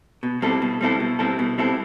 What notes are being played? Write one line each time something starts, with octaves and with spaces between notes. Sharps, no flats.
B2
G3 C4 E4 A4
B2
G3 C4 E4 A4
B2
G3 C4 E4 A4
B2
G3 C4 E4 A4